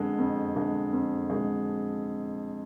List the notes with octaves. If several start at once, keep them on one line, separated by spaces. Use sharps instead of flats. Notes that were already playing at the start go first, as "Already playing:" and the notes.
Already playing: F2 D3 G#3
F2
D3 G#3
F2
D3 G#3